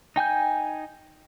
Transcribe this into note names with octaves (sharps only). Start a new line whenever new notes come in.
D#4 G5 G#5 G6